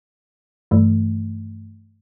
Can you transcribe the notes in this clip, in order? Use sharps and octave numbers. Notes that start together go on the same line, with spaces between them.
G2 E3 A3